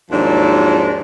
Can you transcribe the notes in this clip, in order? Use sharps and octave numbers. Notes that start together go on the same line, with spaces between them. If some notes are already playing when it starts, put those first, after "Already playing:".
D#2 G#2 D#3 F3 F#3 D4